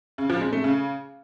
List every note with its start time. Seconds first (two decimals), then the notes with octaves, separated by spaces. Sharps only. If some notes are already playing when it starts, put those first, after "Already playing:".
0.18 C#3
0.30 F3
0.41 G#3
0.52 A3
0.64 C#3